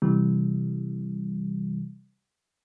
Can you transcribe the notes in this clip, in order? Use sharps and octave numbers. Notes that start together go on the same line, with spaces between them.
C3 E3 G3